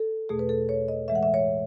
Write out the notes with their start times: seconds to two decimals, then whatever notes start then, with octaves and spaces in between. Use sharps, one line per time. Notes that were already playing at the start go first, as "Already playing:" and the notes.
Already playing: A4
0.29 E2 B2 A3 G#4
0.39 B4
0.49 A4
0.69 C#5
0.88 D#5
1.08 A2 E3 G#3 E5
1.15 F#5
1.23 E5
1.34 C#5